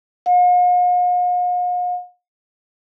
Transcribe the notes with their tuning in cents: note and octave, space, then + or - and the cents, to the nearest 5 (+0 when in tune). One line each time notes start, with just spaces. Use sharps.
F5 +45